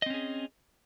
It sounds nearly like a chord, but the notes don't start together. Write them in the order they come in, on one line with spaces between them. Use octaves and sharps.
D#5 C4 C#4 G#4